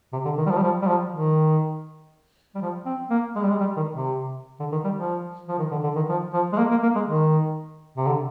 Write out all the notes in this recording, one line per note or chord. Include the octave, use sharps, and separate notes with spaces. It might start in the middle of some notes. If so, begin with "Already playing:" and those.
C3
D3
D#3
G3
F3
G3
F3
G3
F3
D#3
G3
F3
C4
A#3
G#3
G3
G#3
G3
D#3
C3
D3
D#3
G3
F3
F3
D#3
D3
D3
D#3
F3
F3
G#3
A#3
A#3
A#3
G#3
D#3
C3
D3